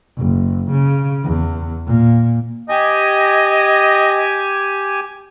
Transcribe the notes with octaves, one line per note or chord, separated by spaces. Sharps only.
F#1
C#3
E2
A#2
G4 D#5 G#5